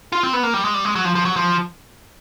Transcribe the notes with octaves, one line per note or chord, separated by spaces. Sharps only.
F4
C4
B3
A#3
G3
G#3
G3
G#3
F#3
F3
F3
F#3
F3